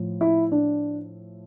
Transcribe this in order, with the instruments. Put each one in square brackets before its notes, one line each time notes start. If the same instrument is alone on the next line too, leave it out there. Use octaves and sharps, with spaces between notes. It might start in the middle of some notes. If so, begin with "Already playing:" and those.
Already playing: [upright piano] A2 F3
E4
D4